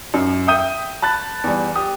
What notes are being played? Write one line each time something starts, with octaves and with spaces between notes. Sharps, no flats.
F#2
E5 G5 D#6 G6 D#7
A5 B5 F#6 A6
E2 G3
G4 D#6